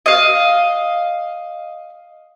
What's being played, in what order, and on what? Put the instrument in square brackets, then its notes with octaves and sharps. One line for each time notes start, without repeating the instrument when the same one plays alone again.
[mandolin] D#5 F5